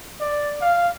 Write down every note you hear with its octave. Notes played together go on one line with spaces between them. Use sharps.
D5
F5